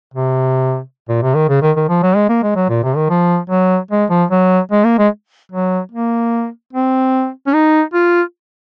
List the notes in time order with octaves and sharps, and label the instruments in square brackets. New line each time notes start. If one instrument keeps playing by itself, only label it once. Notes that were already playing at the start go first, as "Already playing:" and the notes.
[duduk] C3
A#2
C3
D#3
C#3
D#3
D#3
F3
F#3
G#3
A#3
G#3
F#3
A#2
C3
D#3
F3
F#3
G#3
F3
F#3
G#3
A#3
G#3
F#3
A#3
C4
C#4
D#4
F4